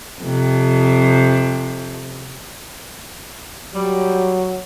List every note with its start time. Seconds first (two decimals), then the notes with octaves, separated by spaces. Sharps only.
0.20 F2 C3
3.74 F#3 G3